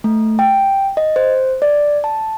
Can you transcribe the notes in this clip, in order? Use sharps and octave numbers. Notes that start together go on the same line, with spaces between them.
A3
G5
D#5
C5
D5
A5